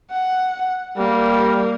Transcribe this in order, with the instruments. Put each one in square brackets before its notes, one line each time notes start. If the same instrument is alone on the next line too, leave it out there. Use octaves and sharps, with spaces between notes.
[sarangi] F#5
[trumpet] G3 [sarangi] A#3